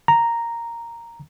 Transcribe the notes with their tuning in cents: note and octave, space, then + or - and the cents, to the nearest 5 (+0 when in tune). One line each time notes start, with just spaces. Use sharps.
A#5 -5